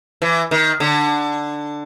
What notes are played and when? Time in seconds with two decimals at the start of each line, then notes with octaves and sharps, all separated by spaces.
0.22 E3
0.51 D#3
0.80 D3